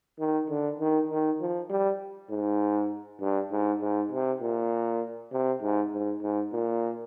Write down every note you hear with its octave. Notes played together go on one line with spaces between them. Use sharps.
D#3
D3
D#3
D#3
F3
G3
G#2
G2
G#2
G#2
C3
A#2
C3
G#2
G#2
G#2
A#2